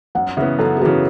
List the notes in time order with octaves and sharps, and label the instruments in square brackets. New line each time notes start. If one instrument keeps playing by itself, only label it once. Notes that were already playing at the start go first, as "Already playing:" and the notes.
[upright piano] F#2 [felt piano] F#5
[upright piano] C#3 E3 B3 [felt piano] E5
[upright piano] F#2 [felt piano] A4
[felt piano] G#4
[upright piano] C#3 E3 B3 [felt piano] F#4